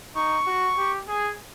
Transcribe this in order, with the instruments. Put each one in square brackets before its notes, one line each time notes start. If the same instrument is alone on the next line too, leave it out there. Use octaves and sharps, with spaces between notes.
[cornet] D#4 [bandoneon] C#6
[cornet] F#4
G4
G#4